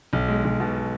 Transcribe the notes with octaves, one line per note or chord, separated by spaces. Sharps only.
B1
G#3
B1
B2